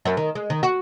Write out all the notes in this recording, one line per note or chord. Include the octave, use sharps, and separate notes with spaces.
F#2
D#3
G#3
D#3
F#4